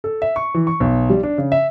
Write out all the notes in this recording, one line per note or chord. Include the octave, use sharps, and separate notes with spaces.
A4
E5
C#6
E3
C#6
B1
G3
D4
C#3
E5